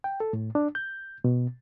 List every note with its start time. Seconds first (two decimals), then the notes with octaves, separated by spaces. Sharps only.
0.04 G5
0.20 A4
0.33 A2
0.55 D4
0.75 G6
1.24 B2